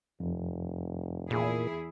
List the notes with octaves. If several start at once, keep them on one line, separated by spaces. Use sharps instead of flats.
F1 F2
E2 A#2 E4 G#4